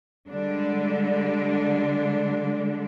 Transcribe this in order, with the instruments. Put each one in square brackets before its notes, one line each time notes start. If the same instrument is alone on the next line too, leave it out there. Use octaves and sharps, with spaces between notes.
[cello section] D3 G3 G#3 D4